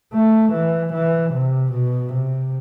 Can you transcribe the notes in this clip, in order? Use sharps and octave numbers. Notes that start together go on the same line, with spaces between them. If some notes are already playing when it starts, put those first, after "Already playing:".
A3
E3
E3
C3
B2
C3